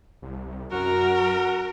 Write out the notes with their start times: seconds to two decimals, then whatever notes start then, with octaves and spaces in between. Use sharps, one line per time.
0.22 C2
0.72 F#2 F#4 A#4